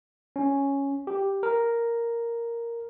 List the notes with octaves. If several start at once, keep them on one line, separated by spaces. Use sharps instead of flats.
C#4
G4
A#4